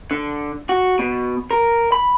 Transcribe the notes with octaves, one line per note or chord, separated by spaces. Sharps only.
D3
F#4
B2
A#4
B5